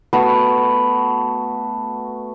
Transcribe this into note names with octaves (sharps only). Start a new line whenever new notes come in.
A3 B3 F#4